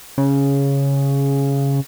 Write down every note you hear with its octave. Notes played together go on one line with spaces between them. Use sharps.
C#3